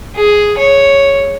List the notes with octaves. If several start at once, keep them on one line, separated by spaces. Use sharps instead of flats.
G#4
C#5